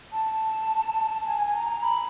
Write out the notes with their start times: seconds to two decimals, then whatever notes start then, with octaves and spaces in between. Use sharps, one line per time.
0.12 A5
1.27 G#5
1.55 A#5
1.83 B5